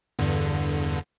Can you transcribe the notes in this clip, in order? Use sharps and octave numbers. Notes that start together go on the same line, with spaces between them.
E2 G2 D3